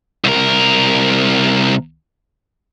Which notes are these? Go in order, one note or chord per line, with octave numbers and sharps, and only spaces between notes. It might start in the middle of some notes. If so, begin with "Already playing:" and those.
C2 A#4